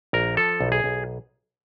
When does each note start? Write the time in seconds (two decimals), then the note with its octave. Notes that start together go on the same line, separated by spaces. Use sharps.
0.13 A#1 A#4
0.37 F3 A4
0.61 B1
0.72 G#4
0.84 B1